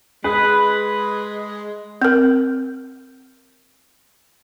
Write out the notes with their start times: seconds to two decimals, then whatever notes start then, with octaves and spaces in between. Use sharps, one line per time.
0.24 G#3 G#4 B4
2.02 C4 A#4